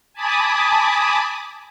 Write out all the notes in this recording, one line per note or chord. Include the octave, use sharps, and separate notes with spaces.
G#5 A5 B5 D6 D#6